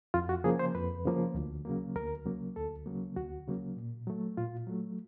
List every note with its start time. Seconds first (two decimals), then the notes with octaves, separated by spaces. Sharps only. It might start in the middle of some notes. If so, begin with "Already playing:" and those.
0.14 F2 F4
0.29 F#4
0.44 C#3 F3 A#3 G#4
0.59 C5
0.74 F2 B4
1.05 C#3 F3 A#3
1.35 D2
1.65 C#3 F#3 A#3
1.95 D2 A#4
2.26 C#3 F#3 A#3
2.56 D2 A4
2.86 C#3 F#3 A#3
3.16 D2 F#4
3.47 C#3 F#3 A#3
3.77 A#2
4.07 F#3 A3
4.37 A#2 F4
4.67 F#3 A3